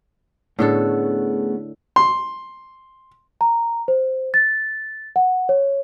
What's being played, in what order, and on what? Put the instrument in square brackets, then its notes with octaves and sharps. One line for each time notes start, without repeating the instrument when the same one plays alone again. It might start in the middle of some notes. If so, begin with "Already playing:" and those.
[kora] A2 D3 A4 [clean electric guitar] A3 B3 C#4 [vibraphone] G#4
[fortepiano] C6
[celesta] A#5
C5
A6
F#5
C#5